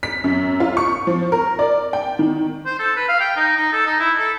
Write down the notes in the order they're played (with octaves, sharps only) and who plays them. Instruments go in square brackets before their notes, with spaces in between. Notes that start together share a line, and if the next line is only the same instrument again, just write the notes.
[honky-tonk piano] B6
F#2
F4
C#6
F3
A#4
D5
G5
D#3
[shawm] C5
A4
B4
F5
G5
D#4
D#4
A4
D#4
E4
A4